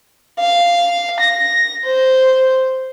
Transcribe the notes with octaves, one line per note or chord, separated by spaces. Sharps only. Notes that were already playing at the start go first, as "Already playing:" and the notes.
F5
A#6
C5